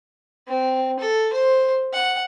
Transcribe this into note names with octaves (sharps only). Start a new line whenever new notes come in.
C4
A4
C5
F#5